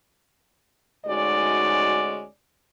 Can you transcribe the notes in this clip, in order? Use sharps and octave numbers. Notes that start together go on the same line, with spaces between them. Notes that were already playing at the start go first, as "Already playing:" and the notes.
D2 G#3 C#4 D#4 F#4 D5